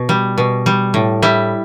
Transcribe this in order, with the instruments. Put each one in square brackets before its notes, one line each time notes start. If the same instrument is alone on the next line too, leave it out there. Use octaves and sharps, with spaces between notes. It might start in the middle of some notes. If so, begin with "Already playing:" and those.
Already playing: [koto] B2
G3
B2
G3
A2
G3 E4